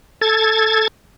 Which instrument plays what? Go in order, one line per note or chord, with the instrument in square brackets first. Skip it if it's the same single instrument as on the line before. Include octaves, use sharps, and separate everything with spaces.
[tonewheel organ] A4 G#6 A6